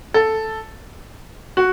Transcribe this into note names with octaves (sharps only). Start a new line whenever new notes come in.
A4
F#4